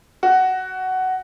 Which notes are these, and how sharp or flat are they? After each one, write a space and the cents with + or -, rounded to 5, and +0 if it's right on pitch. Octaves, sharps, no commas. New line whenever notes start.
F#4 +10